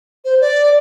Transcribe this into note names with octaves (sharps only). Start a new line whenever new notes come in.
C5
D5